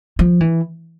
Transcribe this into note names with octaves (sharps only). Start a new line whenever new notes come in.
F3
E3